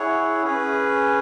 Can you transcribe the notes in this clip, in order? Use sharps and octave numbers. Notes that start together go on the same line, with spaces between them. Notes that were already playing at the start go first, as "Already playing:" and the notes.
Already playing: E4 G#4 C#5 F#5
C#4 G#4 B4